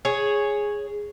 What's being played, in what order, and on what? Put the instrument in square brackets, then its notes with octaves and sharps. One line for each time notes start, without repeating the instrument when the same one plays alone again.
[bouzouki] G#4 C#5